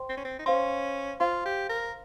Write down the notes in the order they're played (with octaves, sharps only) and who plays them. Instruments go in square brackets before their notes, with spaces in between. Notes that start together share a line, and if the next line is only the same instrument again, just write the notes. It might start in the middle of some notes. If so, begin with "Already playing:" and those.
Already playing: [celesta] C5 G5 C6
[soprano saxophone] C4
C#4
C4
D#4
[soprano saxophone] C#4 [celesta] C5 F5 C6
[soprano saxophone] F4 [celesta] C5 F5 C6
[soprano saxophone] G4
A#4